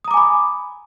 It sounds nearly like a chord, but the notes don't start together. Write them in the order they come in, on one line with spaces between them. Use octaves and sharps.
D#6 A#5 D6 G#5 B5